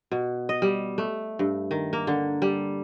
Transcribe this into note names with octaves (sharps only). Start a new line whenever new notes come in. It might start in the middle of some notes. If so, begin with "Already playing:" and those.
B2
D#5
G3
A3
G2
D#3
A#3
D3
G3